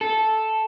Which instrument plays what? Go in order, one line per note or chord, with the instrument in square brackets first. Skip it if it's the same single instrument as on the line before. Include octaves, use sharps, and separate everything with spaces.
[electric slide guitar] A4